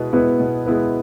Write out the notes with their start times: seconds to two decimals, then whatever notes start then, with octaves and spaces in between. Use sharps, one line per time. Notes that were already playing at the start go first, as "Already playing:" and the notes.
Already playing: B2 G#3 B3 E4 B4
0.13 G#3 B3 E4 B4
0.40 B2
0.66 G#3 B3 E4 B4